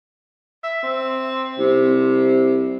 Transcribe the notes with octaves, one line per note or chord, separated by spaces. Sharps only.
E5
C4
C2 C3